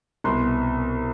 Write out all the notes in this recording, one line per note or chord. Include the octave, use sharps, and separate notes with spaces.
C2 B2 C6